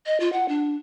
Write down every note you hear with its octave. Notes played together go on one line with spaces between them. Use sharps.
D#5
F4
F#5
D4